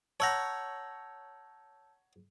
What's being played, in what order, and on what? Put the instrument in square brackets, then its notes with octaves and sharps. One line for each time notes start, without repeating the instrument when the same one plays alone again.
[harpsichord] C#5 F#5 A#5 [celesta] A5 E6 G6